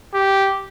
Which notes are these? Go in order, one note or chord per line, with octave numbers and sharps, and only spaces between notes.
G4